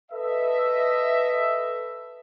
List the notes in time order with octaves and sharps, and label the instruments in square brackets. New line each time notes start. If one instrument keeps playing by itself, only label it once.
[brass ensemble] A4 B4 D#5 E5